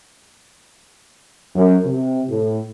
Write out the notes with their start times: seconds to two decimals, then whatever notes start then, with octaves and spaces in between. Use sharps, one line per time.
1.55 F#2
1.85 C3
2.28 A2